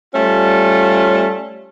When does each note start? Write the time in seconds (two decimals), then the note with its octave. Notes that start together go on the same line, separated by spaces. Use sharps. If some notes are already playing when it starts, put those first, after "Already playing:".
0.14 G3 A3 C#4 F4